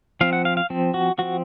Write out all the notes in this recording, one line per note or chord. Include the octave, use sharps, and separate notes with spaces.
F3 C4 F5
F#5
F5
F5
F3 C4
F#4
F3 C4 F#4